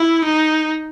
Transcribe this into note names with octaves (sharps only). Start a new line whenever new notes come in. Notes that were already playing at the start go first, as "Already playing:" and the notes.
Already playing: E4
D#4